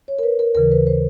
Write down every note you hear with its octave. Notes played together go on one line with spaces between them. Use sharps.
C#5
A#4
B4
A#4
D#2 C#3 E3 A#4
B4
C5